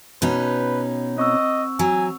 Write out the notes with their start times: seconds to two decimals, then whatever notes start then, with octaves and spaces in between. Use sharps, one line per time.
0.22 B2 C#4 D#4 B4
1.17 C4 D#5 C#6 E6
1.79 F#3 G#5